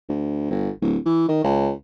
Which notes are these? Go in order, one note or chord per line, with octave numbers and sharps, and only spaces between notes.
D2
G1
D1
E3
D#3
C#2